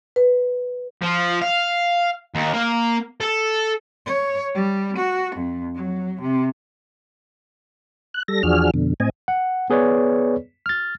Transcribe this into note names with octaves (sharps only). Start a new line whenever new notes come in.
B4
F3
F5
D#2
A#3
A4
C#5
G3
F#4
F2
F#3
C3
F#6
G3 A4 A#6
E2 F3 D4 F#4 G#4 F6
F2 B2 D3
A2 C4 D#5 G#5
F#5
B3 G#4 B4 C#5 D5
F6 A6